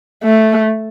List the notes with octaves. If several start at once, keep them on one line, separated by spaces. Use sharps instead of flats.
A3